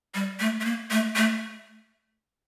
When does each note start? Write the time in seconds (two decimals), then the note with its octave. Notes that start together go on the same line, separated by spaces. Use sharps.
0.15 G3
0.40 A3
0.61 A3
0.65 A#3
0.91 A3
1.16 A3